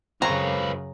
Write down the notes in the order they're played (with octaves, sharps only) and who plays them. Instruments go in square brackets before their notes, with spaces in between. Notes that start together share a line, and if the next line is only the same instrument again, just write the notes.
[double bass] F#2 C#3 [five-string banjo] C4 A#4 C#5 [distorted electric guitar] F4 B4 [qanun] A#5